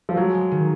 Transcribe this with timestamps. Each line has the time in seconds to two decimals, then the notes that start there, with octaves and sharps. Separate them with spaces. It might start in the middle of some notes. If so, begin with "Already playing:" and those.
0.09 F3
0.17 F#3 G#3
0.34 G#3
0.51 D#3